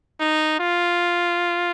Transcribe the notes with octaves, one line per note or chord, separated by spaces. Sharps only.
D#4
F4